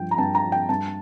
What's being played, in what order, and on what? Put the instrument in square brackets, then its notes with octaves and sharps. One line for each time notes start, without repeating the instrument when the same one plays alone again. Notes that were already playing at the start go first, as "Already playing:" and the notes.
Already playing: [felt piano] G2 F3 G5
A#5
G2 A5
A#5
F3
G5
G2 A5